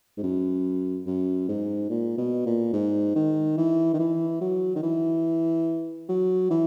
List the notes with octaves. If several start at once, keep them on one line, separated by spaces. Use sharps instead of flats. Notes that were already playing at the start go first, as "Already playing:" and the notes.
G#2
F#2
F#2
G#2
A#2
B2
A#2
G#2
D#3
E3
D#3
E3
F#3
D#3
E3
F#3
E3